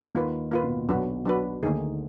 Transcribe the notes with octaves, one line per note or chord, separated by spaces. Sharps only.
D#2 D#3 A#3 F4 B4
A#2 A#3 F4 B4
B2
A#2
B1 B2 F#3 D4 F#4 B4
F#3 D4 F#4 B4
D2 D3 D#3 A#3 D#4 G#4